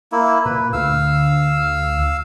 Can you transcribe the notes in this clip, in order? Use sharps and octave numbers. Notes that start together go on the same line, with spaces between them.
A#3 E4
A#2 B4
D2 F5 E6